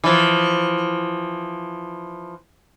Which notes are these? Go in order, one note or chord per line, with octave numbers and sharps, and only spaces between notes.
E3 F3